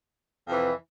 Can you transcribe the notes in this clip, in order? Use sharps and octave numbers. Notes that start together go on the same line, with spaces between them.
F2 C3 E3